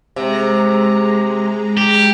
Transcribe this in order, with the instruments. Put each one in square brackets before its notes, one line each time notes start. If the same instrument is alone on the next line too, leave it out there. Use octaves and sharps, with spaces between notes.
[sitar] C3 [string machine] G#3 A#5
[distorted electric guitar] G4